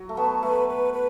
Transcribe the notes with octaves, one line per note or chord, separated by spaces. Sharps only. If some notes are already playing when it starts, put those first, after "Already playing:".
Already playing: F#3
A3
B3 A5
A3 B4
B4
B4